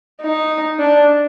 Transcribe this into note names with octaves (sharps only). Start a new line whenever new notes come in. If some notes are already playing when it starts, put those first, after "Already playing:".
D#4
D4